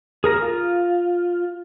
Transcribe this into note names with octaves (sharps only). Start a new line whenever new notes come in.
G#4 A#4 A#5
F4